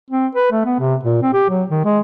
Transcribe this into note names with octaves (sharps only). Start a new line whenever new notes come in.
C4
B4
A3
B3
C3
A#2
C4
G4
F#3
D#3
G#3